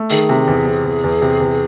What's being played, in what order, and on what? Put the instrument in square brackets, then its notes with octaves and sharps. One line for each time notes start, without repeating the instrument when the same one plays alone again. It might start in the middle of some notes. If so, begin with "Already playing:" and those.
Already playing: [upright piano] A3
[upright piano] D#3 [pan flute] G#4
[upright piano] C3
E2
C3
E2
E2
C3
E2